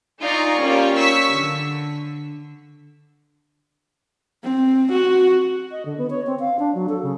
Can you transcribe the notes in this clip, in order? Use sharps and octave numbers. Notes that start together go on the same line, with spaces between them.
D#4 F4 D5 G#5 A#5 C#6
G3 A#3 C#4 F4 G4
C#6 E6 B6
D3
C4
F#4
D#5
D3
B3
C#5
C4
F5
D4
F#3
A4
C#3